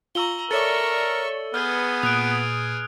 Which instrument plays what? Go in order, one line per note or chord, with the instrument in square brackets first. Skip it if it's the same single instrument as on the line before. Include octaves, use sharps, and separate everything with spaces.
[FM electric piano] F4 [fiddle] A#5 [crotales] C#6 E6 G7
[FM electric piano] A4 C#5 D5 [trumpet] A#4 [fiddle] E5 C#6 [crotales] A6 C#7
[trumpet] B3 [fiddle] G#4 B4 [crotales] F6 G6 G#6
[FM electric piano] A#2 [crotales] D#6 F#6 D7